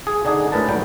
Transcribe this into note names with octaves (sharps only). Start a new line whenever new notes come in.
G#4
D3 D4 D#4 G#4
D2 A2 A#4 B4 A5
D#2 F#3 G3 G5